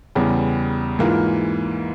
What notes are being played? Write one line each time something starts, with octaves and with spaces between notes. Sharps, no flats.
E2 C#3 G3
G#2 E3 A#3 F4 A#4